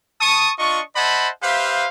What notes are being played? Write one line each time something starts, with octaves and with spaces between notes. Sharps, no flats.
A5 C#6 D#6
D4 F4 D#5 C#6
C5 D#5 E5 F#5 A5 B5
G4 B4 C5 E5 F5